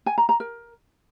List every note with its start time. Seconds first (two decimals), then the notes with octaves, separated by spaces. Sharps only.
0.06 G#5
0.18 A#5
0.29 A#5
0.40 A#4